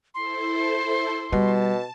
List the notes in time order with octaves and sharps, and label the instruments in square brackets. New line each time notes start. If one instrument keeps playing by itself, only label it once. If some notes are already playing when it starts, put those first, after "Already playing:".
[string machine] E4 A4 C5 [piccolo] C6
[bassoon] B2 [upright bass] G3 [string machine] A5